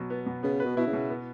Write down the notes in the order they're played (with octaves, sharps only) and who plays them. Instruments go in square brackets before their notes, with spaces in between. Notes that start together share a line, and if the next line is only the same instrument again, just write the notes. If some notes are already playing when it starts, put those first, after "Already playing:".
Already playing: [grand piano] B2 F#3
B3
B2
[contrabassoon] C#3 [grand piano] B3
[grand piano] B4
[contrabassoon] B2
[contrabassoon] B2 [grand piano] E4
[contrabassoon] C#3
[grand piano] B2
B3